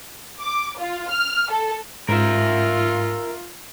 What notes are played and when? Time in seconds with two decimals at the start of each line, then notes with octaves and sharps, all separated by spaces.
0.41 D6
0.78 F4
1.10 F6
1.51 A4
2.09 G#2 F4 A#4 E5